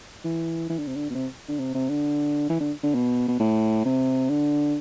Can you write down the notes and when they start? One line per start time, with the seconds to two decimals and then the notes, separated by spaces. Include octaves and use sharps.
0.25 E3
0.70 E3
0.78 D3
0.88 C3
0.96 D3
1.10 B2
1.15 C3
1.48 D3
1.59 C3
1.75 C3
1.90 D3
2.49 E3
2.60 D3
2.83 D3
2.95 B2
3.28 B2
3.40 A2
3.85 C3
4.30 D3